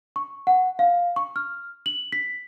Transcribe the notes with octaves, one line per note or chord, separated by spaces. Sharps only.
C#6
F#5
F5
C#6
F6
F#7
B6